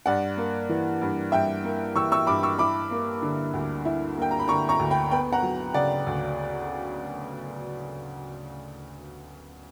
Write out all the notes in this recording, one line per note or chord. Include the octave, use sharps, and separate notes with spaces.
G2 D5 F#5
A#3
E3
G2
G2 E5 G5
A#3
E3 C#6 E6
C#6 E6
G2 B5 D6
C#6 E6
E4 B5 D6
A#3
D3
D2
E4
A#3 G5
A#5
B5
D3 A#5 C#6
A#5 C#6
D2
G5 B5
B3 G5 B5
F#5 A#5
F#3
C#3 D5 F#5
D2